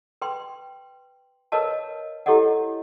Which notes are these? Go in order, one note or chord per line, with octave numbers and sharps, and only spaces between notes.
B4 G5 C6
A#4 B4 C#5 D#5 F5 A5
E4 G4 A4 C#5 D#5 F#5